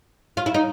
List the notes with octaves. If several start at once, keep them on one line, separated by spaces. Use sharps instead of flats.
F4
E4
D#4